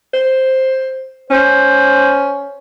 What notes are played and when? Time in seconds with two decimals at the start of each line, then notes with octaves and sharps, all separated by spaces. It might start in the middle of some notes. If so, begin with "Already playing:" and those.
0.14 C5
1.31 C#4 C5